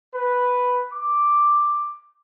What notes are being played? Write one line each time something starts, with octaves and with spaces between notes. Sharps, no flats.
B4
D6